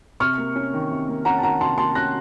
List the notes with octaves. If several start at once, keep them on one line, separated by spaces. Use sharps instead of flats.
C3 C#6 F6
A#3
C#4
D#3
C3
A#3
C#4 F#5 A#5
A5
D#3 F#5 A#5
C3 A5 C6
A#3 A5 C6
C#4 F#6 A#6